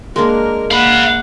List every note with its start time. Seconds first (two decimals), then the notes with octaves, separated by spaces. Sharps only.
0.16 G#3 A#3 D4 A#4
0.71 A#3 D5 F5 F#5 B5